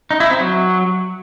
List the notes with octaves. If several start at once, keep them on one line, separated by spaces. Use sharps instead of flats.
D#4
E4
C4
F#3